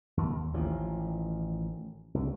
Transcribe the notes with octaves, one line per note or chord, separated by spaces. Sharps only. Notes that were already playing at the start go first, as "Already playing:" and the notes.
D#2
A1 D#3 F3
C2